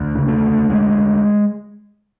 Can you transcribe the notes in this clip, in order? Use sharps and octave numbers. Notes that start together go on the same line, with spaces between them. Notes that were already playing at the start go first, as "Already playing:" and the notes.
Already playing: D2
C#3
A3
D2
D2 G#3
D2